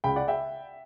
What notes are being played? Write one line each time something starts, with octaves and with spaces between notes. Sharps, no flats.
C#2 G5 B5
D5 F#5
E5 G5